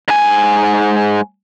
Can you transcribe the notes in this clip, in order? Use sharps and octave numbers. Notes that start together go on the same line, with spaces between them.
G#2 G#5